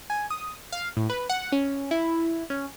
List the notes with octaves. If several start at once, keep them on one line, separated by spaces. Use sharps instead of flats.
G#5
D#6
F5
A2
B4
F#5
C#4
E4
C#4